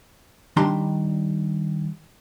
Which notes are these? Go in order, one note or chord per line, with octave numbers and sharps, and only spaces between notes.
D#3 G3 D4 A#5 C6